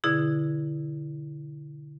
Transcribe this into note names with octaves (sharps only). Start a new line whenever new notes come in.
B2 D3 E4 G#4